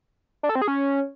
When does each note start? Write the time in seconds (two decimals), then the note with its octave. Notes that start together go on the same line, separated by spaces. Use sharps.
0.43 D4
0.49 A4
0.55 C4
0.62 G#4
0.68 C#4